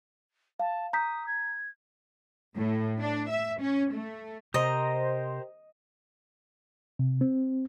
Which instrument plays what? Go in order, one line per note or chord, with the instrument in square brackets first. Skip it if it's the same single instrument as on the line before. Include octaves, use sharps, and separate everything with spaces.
[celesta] F5 [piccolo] A5
[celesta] A#5 G6 B6 [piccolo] D#6
[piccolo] G#6
[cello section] A2
D4
E5
C#4
A3
[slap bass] C3 [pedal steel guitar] G4 A#4 A#5 [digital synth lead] C5 [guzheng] D#5
[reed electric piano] C3
C4